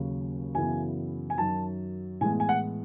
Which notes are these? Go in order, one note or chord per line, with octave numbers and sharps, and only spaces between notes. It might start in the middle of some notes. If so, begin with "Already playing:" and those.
Already playing: D#2 C#3 F#3
F#2 C#3 E3 B3 G#5
G#5
F#2 D#3 F#3 A5
A2 E3 G#3 B3 G#5
G#5
F#5